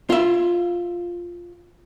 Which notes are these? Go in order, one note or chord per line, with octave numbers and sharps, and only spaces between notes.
F4 E5